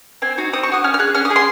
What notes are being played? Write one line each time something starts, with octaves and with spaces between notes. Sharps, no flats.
C4 G#5
D#4 F#4
C4 D#6
C#6
D#4
F#4 D#6
C#4 F6
F6
G#4 F#6
C#4 F6
D#6
G#4
C6